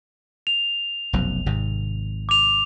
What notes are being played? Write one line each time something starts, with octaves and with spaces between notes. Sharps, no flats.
F7
F1 B1 F#2
G#1 G#2 C3
D6 F7